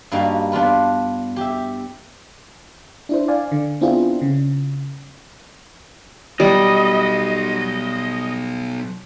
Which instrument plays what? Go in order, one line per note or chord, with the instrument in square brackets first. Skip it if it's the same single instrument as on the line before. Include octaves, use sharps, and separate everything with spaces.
[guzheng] G2 G3 A#3 D#4 F#4
B3 D4 F4 B4
G4 E5
[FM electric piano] D4 E4 C5
D5 F5 G#5
D3
B3 C4 D4 E4 F4 G#4
C#3
[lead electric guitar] B2 F#3 [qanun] G3 [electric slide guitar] D#5